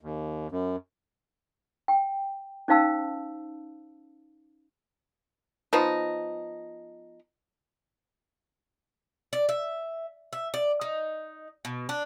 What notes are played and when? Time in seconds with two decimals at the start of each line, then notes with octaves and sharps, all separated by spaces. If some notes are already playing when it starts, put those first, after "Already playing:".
0.01 D#2
0.52 F#2
1.88 G5
2.68 C#4 D#4 C5 F5 A5 E6
5.73 F3 B3 D#4
9.33 D5
9.49 E5
10.33 E5
10.54 D5
10.81 D#4
11.65 B2
11.89 D4